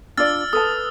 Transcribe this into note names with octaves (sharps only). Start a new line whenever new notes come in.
D4 F4 D5 E6 F6 A6
A4 B4 A5 D#6